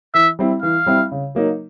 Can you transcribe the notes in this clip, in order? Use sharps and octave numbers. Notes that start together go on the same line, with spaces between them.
E3 E5
G3 C4 E4
E3 F5
G3 C4 E4
C#3
F#3 A#3 D#4